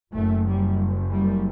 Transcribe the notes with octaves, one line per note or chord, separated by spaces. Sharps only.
F#1 F#2 A3
G3
G3